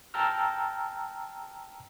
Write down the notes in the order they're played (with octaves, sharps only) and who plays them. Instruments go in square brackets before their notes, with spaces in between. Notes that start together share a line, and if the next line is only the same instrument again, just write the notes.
[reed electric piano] G5 A5 A#5 E6 F6